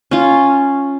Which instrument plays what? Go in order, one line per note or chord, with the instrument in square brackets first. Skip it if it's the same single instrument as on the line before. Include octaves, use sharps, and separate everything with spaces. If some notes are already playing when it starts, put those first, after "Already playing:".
[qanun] C#4 F4